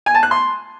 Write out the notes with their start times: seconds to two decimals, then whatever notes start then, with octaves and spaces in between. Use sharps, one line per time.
0.06 G#5
0.15 A5
0.23 F#6
0.31 C6